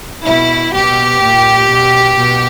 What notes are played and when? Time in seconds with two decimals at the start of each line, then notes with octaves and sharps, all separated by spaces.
0.24 B2 E4
0.72 B2 G4
1.20 A#2
1.67 B2
2.17 B2